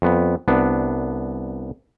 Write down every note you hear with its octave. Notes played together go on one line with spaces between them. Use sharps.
F2 B3
C2 B3 D4